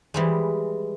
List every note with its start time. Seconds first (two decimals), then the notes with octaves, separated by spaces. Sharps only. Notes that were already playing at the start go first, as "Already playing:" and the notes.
0.14 E3 G3 G#3